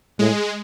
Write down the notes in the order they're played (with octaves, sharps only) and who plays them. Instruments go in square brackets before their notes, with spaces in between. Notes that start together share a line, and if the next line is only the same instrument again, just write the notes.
[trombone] A2 [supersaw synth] G#3